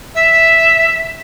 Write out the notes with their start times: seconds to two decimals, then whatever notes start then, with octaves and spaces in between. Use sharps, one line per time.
0.14 E5